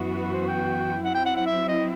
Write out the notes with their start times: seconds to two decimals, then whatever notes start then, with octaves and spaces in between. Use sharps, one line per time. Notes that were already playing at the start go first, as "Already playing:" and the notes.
Already playing: F#2 E3 B3 F#4
0.19 B4
0.33 C5
0.47 G5
1.04 F#3 C4 E4 F#5
1.15 G5
1.26 F#5
1.36 F#5
1.46 E5
1.68 D#5